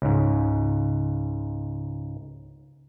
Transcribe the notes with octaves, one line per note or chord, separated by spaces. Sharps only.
C#2 G#2